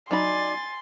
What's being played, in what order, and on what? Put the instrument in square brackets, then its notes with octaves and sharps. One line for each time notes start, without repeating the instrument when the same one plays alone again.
[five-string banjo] F#3 D#4 B5 [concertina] D5 [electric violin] G#5 A6 [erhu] C6